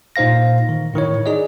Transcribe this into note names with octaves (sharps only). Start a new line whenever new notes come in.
A#2 D#4 C5 F5 A#6
D#3
A2 D#3 E4 C#5
D#4 G#4 D5 D#5